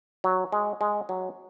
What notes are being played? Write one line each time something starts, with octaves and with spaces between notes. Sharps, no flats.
F#3
G#3
G#3
F#3